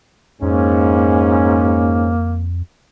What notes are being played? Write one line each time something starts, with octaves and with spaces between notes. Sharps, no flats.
F2 G#2 A#3 C#4